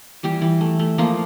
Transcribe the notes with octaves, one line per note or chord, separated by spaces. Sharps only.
E3 G3 G4
E3
A3
A3
F3 A#3 F4